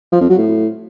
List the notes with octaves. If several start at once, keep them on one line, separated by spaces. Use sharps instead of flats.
F3
F2
F#3
A2